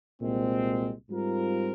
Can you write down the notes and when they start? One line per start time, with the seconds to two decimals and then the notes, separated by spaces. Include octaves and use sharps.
0.21 C2 A#2 G#3 C4
1.10 G#2 G3 C4 F4 A#4